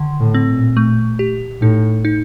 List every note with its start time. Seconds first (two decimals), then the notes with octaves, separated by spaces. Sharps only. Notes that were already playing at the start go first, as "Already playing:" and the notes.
Already playing: D3 D#3
0.20 A2
0.34 C4
0.49 A#2
0.77 A3
1.19 G4
1.61 A2 D#4
2.05 D#4